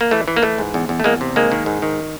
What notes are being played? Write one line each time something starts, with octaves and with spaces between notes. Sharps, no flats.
A#3
E3 A3
E3
A#3
E3 A3
G#2
E2
E2
A3
E2 G#3 A#3
C3
D#3 G#3 A#3
D#3
G#2
D#3